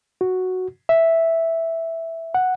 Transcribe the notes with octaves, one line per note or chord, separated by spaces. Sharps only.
F#4
E5
F#5